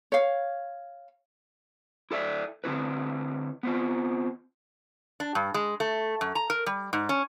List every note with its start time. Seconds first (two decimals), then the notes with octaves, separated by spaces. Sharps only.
0.12 C#5 F5
2.11 E4 A4 D5 E5
2.64 D3 C4 E4 B4
3.63 B3 C4 F4
5.20 D4
5.35 G2
5.54 G#3
5.80 A3
6.21 F#2
6.35 A#5
6.50 A#4
6.66 G3
6.93 G#2
7.09 C#4